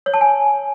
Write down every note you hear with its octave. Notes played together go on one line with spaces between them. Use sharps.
C#5
A5
G#5